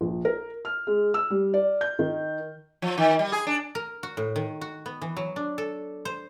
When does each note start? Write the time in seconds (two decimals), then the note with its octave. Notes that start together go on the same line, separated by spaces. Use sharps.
0.01 A#1
0.25 A#4
0.65 F6
0.87 G#3
1.14 E6
1.30 G3
1.54 D5
1.81 G6
1.99 D#3
2.82 F3
2.98 D#3
3.19 G3
3.32 G#4
3.47 D4
3.75 A#4
4.03 F#4
4.17 A2
4.36 D#3
4.61 F#4
4.86 B3
5.02 E3
5.17 F#3
5.36 D4
5.58 A4
6.05 C5